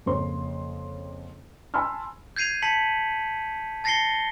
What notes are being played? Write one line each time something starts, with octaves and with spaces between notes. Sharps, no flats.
F2 C#3 A#3 C5 C#5 C6
G#5 A5 B5 C6 E6 F6
G6 G#6 C7 D#7 F7
A5 B6 C#7 F#7
A5 A6 A#6 C7 C#7 G7